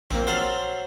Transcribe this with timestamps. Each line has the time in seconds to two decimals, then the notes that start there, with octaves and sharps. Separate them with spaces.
0.11 A#1 A#3 C4
0.27 F#3 C5 E6 F6 A6